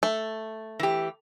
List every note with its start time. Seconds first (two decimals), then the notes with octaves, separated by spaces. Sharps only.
0.03 A3
0.79 E3 G4